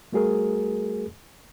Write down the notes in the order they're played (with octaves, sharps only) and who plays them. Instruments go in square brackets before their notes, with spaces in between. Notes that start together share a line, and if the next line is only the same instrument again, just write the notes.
[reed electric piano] G3 A3 F#4 G#4 A#4